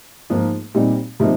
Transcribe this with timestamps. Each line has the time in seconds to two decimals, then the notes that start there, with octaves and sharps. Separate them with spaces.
0.30 G#2 F3 A#3
0.74 A#2 G3 C4 D#4
1.20 C3 F3 A#3 D#4